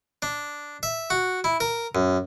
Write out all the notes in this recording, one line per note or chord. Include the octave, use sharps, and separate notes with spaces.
D4
E5
F#4
E4
A#4
F#2